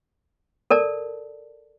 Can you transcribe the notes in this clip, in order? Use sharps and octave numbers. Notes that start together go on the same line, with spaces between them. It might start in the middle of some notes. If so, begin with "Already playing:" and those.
A4 A#4 D5 A5